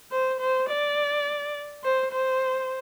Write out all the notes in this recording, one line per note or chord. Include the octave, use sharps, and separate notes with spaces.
C5
C5
D5
C5
C5